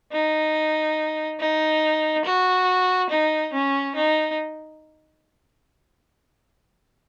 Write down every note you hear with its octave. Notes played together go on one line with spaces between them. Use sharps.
D#4
D#4
F#4
D#4
C#4
D#4